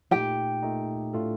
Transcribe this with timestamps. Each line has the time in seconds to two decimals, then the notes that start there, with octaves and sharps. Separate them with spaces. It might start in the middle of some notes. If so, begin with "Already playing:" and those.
0.11 A#2 A3 D#4 G4 G5
0.62 A#2 A3 D#4
1.13 A2 A3 D4 F4 A4